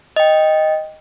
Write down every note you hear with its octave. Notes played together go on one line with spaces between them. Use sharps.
D#5 G5